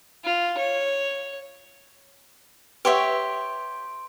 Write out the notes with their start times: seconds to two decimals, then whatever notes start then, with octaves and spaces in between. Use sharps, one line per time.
0.24 F4
0.57 C#5
2.85 G4 B4 C#5 E5 F#5 C6 C#6 D7